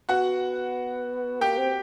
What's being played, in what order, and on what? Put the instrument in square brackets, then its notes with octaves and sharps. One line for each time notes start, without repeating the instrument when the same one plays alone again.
[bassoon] B3 [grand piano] F#4 F#5
[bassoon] A#3 [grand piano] G4 G5
[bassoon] C4